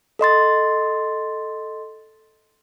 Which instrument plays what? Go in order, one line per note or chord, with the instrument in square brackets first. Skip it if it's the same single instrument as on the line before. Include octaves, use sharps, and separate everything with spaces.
[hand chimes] A4 D#5 C6 A6